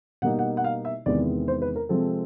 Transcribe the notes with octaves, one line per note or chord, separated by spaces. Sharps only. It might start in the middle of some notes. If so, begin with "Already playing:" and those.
B2 G3 A#3 D#4 F#5
F#5
F#5
F5
E5
E2 C3 D#3 G#3 B3 D5
C5
B4
A#4
C3 F3 G#3 C4 A4